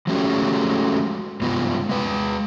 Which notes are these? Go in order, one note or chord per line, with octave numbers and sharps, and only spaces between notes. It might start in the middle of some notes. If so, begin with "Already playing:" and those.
F3 G#3 A3 C#4 F#4 G4
G2 C3 G#3 B3 F4
G#3 B4